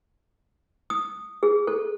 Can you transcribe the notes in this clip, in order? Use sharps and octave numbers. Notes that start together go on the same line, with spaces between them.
D#6
G#4
A4